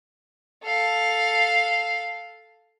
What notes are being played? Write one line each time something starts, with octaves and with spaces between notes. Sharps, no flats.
A4 F5